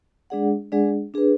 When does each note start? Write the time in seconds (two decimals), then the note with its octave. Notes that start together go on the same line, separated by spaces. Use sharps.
0.30 G#3 D4 G#4 D5 F#5
0.72 G#3 D4 G#4 D5 F#5
1.14 D4 G#4 B4